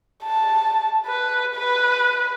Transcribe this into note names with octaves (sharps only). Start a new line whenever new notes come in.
A5
B4
B4